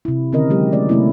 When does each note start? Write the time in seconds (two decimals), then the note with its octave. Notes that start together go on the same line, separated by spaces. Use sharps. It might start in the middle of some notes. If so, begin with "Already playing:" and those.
0.05 C3 E4
0.33 D3 D#3 C4 C#4 A#4 D#5
0.50 F#3 G#3 G4
0.72 A3 C#4 D5
0.89 C3 G3 A3 A#3 C4 E4